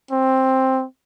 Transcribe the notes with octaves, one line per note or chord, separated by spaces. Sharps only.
C4